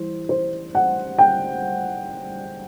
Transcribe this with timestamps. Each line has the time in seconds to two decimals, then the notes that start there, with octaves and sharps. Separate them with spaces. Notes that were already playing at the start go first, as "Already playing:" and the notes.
Already playing: E3 G3 C5
0.29 C5
0.75 F#5
1.18 G5